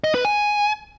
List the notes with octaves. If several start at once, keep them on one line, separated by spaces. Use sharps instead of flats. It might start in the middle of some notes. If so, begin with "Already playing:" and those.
D#5
B4
G#5